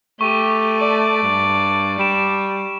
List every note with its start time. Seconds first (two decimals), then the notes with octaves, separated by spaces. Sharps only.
0.21 A3 G4 C#6 D#7
0.79 D5 A5
1.23 G2
1.98 G3 D7 E7